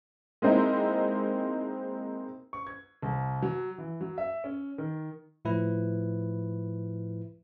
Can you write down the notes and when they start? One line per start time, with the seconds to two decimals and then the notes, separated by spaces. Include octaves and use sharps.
0.42 G#3 A#3 C4 D#4 E4
2.53 C#6
2.67 G#6
3.02 C2
3.42 F#3
3.78 E3
4.01 F#3
4.18 E5
4.44 C#4
4.78 D#3
5.45 A2 F3 E4 B4